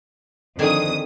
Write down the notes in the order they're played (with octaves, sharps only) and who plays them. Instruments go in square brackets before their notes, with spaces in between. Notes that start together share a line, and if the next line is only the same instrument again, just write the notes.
[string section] F2 D#6 [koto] D3 D#3 G#4